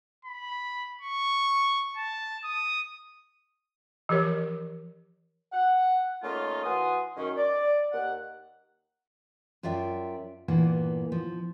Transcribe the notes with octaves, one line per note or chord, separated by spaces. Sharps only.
B5
C#6
A5
D#6
E3 F3 G4 A#4 C#5
F#5
A3 A#3 C#4 D#4 F4
E3 F#4 F#5 G#5 C6 D#6
F#2 D#3 C#4
D5
D#2 F#5
F#2 F4 D5 E5 G5
G2 A#2 E3 A#3 B3
F3